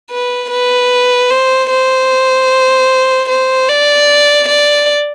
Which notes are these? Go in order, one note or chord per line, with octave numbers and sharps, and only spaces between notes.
B4
B4
C5
C5
C5
D5
D5